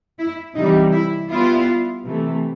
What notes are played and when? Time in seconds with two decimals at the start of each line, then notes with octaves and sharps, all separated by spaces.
0.19 E4
0.55 C3 E3 G3 D#4
0.92 E4
1.30 G3 B3 E4 F4
2.04 C3 E3 A3